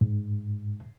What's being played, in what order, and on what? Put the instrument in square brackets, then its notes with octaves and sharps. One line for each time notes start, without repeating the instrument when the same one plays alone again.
[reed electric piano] G#2